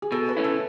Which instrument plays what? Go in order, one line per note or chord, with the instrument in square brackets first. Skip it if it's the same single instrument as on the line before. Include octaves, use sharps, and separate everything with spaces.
[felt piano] G#4
[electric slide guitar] B2 [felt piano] A4
[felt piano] B4
[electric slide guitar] A3 C#4 E4
[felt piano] A4